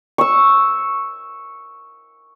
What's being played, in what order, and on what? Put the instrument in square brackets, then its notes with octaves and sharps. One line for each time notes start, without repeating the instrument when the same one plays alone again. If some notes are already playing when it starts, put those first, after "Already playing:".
[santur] C#6 E6